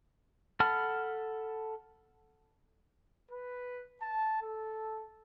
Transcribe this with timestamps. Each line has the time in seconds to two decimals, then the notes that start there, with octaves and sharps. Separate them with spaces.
0.60 A4 F#5 A5 B5 F6
3.31 B4
4.02 A5
4.42 A4